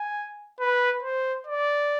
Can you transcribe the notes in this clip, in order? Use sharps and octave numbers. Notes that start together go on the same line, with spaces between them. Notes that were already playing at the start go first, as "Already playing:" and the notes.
Already playing: G#5
B4
C5
D5